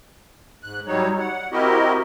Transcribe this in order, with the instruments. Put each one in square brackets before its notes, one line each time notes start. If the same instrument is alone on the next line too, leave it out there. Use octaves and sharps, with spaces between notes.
[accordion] G#2 F#6
F#3 G3 D#4 C#5
F#5
C4 E4 F#4 G4 A#4 D#5